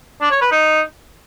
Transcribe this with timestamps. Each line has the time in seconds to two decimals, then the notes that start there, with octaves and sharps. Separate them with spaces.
0.21 D4
0.31 C#5
0.41 B4
0.51 D#4